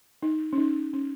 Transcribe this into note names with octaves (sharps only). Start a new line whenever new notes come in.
D#4
C#4
D#4
C#4